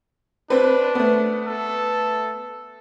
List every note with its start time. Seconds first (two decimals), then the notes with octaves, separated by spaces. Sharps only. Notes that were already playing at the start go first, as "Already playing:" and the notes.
0.50 C4 D4 B4
0.95 A3 B3
1.46 A4